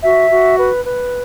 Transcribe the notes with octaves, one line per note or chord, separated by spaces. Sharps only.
F#4 E5
F#4
B4
B4